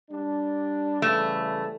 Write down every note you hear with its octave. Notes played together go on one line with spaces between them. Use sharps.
G3 D4
C#3 E3 G3 A3